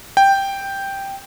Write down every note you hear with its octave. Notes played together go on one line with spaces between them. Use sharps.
G5